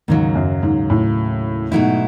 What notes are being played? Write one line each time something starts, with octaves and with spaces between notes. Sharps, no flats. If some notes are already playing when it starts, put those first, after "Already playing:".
D#2 G#2 C#3 F#3
F#2
G#2
A2
G#2 B2 F#3 A3 E4